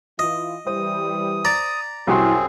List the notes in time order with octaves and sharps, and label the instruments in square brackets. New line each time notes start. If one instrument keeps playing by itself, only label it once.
[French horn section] E3 F4 [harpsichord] D#5
[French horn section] E3 G3 [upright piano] C5 [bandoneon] D#6
[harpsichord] D5 A#5
[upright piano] C2 F#4 C6 [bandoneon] F#2 C4 G#4 [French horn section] E4